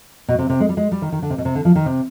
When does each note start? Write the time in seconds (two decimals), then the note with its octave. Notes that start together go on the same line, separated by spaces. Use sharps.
0.28 B2
0.39 C3
0.50 C3
0.60 G#3
0.69 G3
0.77 G#3
0.92 G3
1.02 D#3
1.12 D#3
1.22 D3
1.30 C3
1.38 B2
1.45 C3
1.55 D3
1.65 F3
1.75 D#3
1.86 C3